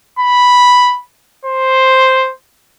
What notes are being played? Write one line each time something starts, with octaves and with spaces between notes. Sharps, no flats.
B5
C5